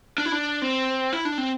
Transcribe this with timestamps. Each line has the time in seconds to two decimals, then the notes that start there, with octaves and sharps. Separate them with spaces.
0.18 D4
0.25 E4
0.32 D4
0.62 C4
1.13 E4
1.25 D4
1.38 C4